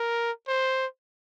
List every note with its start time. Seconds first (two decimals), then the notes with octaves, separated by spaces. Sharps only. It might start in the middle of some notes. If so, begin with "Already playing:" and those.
Already playing: A#4
0.48 C5